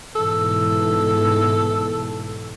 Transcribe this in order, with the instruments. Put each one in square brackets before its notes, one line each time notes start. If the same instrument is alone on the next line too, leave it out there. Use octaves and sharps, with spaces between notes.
[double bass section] G#2 B2 E3 [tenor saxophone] A4